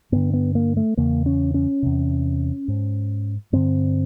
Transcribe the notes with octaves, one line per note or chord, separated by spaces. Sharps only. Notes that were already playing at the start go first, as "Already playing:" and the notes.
G2 D3 B3
B3
A#3
A3
E2 C#3 A#3
C#4
C#4
E2 C3
G#2
G2 D3 C4